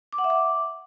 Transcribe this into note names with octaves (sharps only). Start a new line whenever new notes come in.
D6
F#5
E5
D6